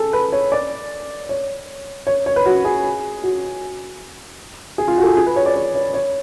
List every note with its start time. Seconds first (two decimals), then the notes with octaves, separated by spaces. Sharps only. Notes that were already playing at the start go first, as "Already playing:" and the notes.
Already playing: G#4 A4
0.13 B4
0.32 C#5
0.52 D5
1.29 C#5
2.07 C#5
2.26 C#5
2.36 B4
2.46 F#4
2.65 G#4
3.23 F#4
4.78 G#4
4.88 F4
4.98 F#4
5.03 A4
5.07 G#4
5.17 G#4
5.27 B4
5.36 C#5
5.46 D5
5.55 C#5
5.75 C#5
5.94 C#5